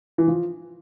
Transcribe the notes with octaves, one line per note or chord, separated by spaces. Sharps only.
E3
F3